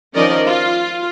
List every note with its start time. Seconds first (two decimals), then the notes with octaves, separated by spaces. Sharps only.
0.15 D#3 F3 C#4 A#4 D5 D#5
0.47 F4